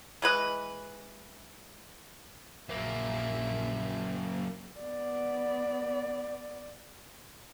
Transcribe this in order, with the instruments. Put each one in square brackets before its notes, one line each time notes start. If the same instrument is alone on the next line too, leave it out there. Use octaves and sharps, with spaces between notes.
[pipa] E3 G#3 B4 D#5
[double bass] A#1 [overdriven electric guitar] F#2 A#3 [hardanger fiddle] E5
[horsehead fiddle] B3 D5